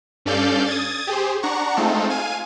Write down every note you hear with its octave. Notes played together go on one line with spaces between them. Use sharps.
G2 C#4 A4 D5 F5 G6
D#6 G#6 A6
G4 G#4 C5
D4 F#5 A#5 C#6
G#3 A3 C4 D#4 F4 A4
F5 G#5 D#7